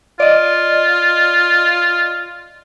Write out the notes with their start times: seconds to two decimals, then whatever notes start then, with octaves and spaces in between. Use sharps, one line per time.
0.20 F4 D5 D#5